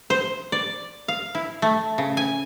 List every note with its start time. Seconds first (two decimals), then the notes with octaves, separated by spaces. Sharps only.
0.10 C5
0.52 D5
1.08 F5
1.35 E4
1.62 A3
1.98 C#3
2.17 G#5